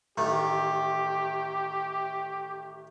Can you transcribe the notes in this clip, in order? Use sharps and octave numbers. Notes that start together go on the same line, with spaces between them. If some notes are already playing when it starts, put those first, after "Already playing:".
A1 D#3 A3 G4